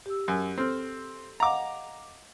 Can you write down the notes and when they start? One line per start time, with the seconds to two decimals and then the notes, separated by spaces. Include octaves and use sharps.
0.06 G4 E6
0.28 F#2
0.58 C4 A4 F6
1.40 D#5 F5 F#5 A#5 D6